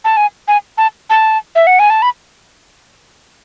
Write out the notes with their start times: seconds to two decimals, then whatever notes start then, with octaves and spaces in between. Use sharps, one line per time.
0.05 A5
0.17 G#5
0.48 G#5
0.78 A5
1.10 A5
1.55 E5
1.67 F#5
1.79 G#5
1.90 A5
2.02 B5